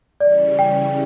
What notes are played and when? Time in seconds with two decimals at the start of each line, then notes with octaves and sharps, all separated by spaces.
0.20 C#3 E3 G3 C#4 D5
0.59 G5